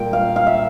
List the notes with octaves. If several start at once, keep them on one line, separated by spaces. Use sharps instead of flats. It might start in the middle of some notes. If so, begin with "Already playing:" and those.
Already playing: A#2 G3 A#3 A#4 G5
F5
F5
E5